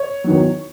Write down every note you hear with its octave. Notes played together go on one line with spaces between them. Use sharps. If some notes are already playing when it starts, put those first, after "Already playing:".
Already playing: C#5
E2 D#3 F#3